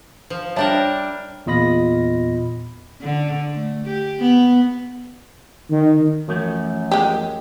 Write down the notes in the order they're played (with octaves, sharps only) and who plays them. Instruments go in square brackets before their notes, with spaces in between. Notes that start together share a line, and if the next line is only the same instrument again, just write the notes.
[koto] F3
[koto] G3 D4 A#4 [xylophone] C#5 E5 A5
[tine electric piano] E2 A#2 F4 D#5 B5 A#6
[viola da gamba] D3
A3
G4
B3
[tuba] D#3
[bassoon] F#2 [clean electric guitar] E3 F3 A3
[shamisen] G#3 G4